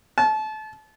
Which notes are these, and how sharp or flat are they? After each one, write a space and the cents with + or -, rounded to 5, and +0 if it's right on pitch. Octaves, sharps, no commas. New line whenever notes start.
A5 -30